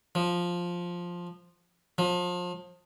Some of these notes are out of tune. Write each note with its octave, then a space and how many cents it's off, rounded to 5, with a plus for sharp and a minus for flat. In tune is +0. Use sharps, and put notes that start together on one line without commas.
F3 +5
F3 +30